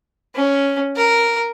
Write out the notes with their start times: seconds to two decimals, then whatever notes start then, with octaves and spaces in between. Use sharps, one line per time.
0.35 C#4
0.96 A#4